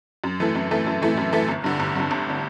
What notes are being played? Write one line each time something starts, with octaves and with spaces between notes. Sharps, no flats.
F#2
E3 A3 E4 A4
F#2
E3 A3 E4 A4
F#2
E3 A3 E4 A4
F#2
E3 A3 E4 A4
G1
G2 D3
G1
G2 D3
G1
D3